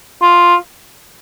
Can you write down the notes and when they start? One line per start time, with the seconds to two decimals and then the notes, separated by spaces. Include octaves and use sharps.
0.22 F4